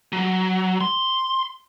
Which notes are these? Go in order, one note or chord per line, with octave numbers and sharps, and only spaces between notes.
F#3
C6